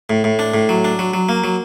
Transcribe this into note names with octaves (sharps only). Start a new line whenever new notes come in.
A2
A2
D4
A2
F#3
D4
F#3
F#3
A#3
F#3